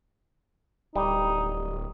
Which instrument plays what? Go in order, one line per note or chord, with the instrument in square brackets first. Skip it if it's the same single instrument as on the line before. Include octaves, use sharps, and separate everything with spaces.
[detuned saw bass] D1 [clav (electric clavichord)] G3 [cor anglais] D#4